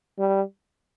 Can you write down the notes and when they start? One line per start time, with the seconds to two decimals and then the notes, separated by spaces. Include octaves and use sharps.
0.19 G3